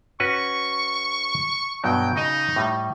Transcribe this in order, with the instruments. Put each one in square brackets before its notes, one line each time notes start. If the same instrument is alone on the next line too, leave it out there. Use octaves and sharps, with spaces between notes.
[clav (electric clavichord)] C#4 F#4 B4 [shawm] C#6
[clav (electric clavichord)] G2 B2 F#3 [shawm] G5
[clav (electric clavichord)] C#3 D#5 [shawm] D#4
[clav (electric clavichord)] A2 G3